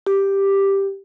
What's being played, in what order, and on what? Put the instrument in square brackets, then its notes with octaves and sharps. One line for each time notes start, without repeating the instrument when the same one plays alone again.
[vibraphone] G4